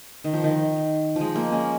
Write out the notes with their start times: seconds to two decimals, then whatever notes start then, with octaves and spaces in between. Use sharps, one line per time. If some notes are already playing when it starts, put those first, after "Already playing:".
0.24 D#3
0.34 F3
0.44 D#3
1.16 F3 G#3
1.36 A#3
1.52 G#3 C#4